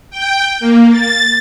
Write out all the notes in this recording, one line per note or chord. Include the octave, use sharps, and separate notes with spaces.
G5
A#3
A6